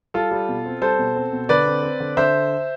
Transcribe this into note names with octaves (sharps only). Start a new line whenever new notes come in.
G3 F4 A4
G3
B2
C4
G3 A4 C5
B2
C4
B2
D3 B4 D5
C4
C4
D3
D3 C5 E5